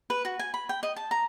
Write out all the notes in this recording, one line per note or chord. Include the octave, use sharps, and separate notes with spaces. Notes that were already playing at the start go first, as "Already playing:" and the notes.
B4
F#4
G#5
B5
G5
D#5
A5
A#5